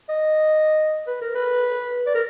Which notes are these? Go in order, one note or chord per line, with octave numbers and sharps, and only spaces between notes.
D#5
B4
A#4
B4
D5
A#4